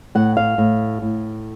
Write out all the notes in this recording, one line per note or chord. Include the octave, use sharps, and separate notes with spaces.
A2 F#5
F5
A2
A2